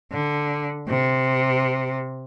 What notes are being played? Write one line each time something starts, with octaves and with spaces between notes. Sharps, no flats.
D3
C3